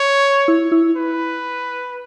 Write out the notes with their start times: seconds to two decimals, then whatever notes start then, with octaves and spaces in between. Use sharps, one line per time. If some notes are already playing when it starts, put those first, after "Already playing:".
Already playing: C#5
0.48 E4
0.72 E4
0.96 B4